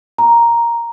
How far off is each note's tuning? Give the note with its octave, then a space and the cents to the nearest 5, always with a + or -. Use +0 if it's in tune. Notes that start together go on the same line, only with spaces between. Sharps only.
A#5 +5